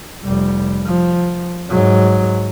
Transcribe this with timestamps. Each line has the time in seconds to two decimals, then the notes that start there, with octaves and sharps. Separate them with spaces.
0.24 F1 G3
0.87 F3
1.69 G#2 F#3